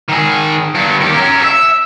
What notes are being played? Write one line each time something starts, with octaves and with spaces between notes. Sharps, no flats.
D#3 G#4
G2 B3
D#3 G4
C#4 A#4
A4 E5